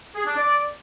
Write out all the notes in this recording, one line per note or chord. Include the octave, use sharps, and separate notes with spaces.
G#4
D4
D5